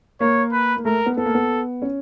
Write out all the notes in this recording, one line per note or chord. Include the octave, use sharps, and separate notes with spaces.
A#3 C#5
B4
A#3
A3 A#4
B3
B3 A4
A#3
B3
C#4